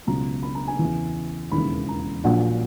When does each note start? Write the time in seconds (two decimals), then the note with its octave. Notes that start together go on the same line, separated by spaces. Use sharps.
0.07 C#2 B2 F#3 A#5
0.43 B5
0.55 A#5
0.67 G#5
0.79 E2 C#3 E3
1.51 E1 D#2 C#3 E3 B5
1.89 A#5
2.24 A#1 A#2 F#3 F#5